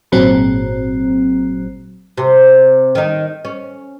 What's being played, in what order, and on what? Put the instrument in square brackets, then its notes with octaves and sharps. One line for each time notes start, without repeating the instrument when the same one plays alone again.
[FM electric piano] G#1 A#2 F#3 C4
[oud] C3
D#3 D#4
C#4